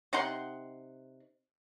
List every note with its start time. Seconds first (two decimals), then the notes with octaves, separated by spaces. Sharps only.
0.13 C3 D#4 F#5 C6